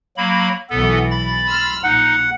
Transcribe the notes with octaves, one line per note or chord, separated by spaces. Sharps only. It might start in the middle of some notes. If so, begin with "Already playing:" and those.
F#3 A#3 B5
B1 E3 B3 A4
B5 A6
C6 E6 F6
A#1 D#4 F#5